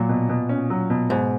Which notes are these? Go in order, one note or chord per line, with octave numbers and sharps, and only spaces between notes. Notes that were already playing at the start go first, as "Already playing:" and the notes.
Already playing: A#2 F#3
B2
B2
C#4
F#3
B2
G#2 B2